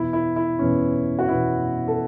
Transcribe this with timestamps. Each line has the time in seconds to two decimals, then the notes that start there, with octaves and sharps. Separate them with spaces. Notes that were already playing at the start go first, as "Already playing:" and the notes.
Already playing: E2 B2 E4
0.13 E4
0.36 E4
0.59 E2 B2 C#4
1.19 F#4
1.29 E2 B2 E4
1.88 A4